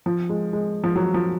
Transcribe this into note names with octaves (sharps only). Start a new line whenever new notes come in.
F3
G#3
G#3
F3
F#3
F3